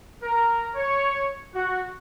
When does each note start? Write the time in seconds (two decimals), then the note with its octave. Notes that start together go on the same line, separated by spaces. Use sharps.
0.22 A#4
0.75 C#5
1.54 F#4